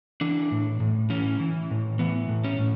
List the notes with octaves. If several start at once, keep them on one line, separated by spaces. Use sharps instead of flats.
E3 D4
A2
A2
E3 C#4
E3
A2
E3 B3
A2
C#4
A2